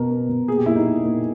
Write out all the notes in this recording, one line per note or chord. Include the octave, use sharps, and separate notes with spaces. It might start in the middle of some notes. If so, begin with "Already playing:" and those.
Already playing: B2 B3 A#4
B3
B2
A#2 G#4
G4
A#2 E4
D#4
A#2
A#2